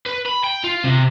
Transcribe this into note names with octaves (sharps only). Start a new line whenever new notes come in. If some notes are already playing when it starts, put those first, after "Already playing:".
B4
B5
G5
F4
C3